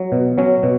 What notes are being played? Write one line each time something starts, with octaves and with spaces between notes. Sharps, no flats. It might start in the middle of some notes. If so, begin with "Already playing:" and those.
Already playing: F#3
B2
F#3 C#4
B2